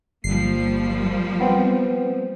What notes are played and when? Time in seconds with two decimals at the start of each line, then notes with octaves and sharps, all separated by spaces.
0.24 G1 F3 G3 A#3 C7
1.40 B3 C4